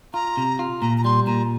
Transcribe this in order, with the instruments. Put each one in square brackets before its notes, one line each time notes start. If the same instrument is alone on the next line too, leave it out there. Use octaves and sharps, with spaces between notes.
[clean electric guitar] F4 [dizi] A#5
[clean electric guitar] C3
F4
[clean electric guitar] A#2 [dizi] A#5
[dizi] A#5
[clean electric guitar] G3 [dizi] C6
[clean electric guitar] A#2 [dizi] A#5